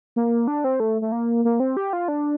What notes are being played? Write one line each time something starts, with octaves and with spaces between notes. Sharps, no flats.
A#3
D4
C4
A3
A3
A#3
A#3
C4
G4
F4
D4